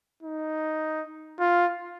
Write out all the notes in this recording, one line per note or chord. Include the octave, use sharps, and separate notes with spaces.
D#4
F4